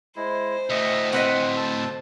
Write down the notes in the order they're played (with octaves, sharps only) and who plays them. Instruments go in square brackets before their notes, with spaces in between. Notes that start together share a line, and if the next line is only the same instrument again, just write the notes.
[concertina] G#3 E4 [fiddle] C5
[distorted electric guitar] D2 A2 [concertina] D#5 E5
[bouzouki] C4 B4 D#5 [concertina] F#5
[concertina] A5 E6